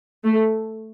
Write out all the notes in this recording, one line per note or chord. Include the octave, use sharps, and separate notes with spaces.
A3